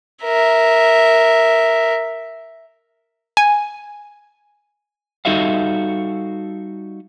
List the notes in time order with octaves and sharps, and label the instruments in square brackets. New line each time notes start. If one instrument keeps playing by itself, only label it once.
[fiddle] A#4 E5
[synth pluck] G#5
[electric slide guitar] G3 D#4 F#4 A4 E5 F5